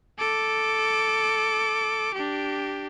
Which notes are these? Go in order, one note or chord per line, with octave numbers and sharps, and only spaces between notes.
A4 D6
D4 G4